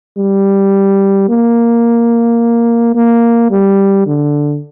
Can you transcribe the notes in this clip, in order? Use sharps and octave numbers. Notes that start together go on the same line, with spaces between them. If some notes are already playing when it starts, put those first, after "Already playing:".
G3
A#3
A#3
G3
D3